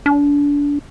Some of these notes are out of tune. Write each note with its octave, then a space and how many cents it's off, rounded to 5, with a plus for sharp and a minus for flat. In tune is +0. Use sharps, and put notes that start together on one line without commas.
D4 -30